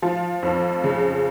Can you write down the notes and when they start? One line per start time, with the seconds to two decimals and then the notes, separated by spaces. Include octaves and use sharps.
0.02 F3
0.43 F2
0.84 C#3